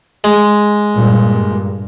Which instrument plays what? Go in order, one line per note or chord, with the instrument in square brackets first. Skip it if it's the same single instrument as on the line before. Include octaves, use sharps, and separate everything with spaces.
[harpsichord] G#3
[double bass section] G2 A#2